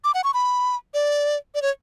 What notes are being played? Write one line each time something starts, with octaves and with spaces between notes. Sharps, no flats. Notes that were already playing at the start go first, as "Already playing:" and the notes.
D6
F#5
C#6
B5
D5
D5
C#5